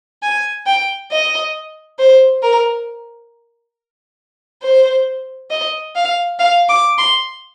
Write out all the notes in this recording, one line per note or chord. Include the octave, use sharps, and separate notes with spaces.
G#5
G5
D#5
C5
A#4
C5
D#5
F5
F5
D6
C6